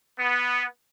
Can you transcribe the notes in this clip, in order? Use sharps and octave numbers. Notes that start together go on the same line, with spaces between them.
B3